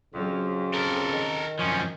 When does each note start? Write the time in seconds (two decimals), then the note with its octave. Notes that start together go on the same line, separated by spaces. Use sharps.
0.14 F2 C#3 F#3
0.74 A4 A#4
1.08 D#3
1.59 F#2 F3 C#4